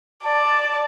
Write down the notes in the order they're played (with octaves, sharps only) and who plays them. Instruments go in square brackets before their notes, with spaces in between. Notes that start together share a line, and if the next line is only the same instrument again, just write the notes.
[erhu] D5 [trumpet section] A5